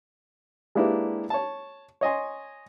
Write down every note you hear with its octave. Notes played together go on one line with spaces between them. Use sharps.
G#3 A#3 D4 E4 G4 B4
C#5 A5
C#5 D#5 G#5 C6